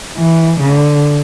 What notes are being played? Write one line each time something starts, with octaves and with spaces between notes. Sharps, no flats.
E3
D3